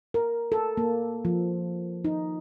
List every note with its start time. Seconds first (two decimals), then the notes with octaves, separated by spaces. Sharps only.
0.14 A#4
0.52 A4
0.77 A#3
1.25 F3
2.05 D#4